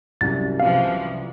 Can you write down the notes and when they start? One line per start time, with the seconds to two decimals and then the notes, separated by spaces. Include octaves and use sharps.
0.21 C2 F#2 A6
0.60 C3 E3 F3 F5